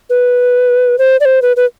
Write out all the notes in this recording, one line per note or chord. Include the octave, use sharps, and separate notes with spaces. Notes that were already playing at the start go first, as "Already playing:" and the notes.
B4
C5
D5
C5
B4
B4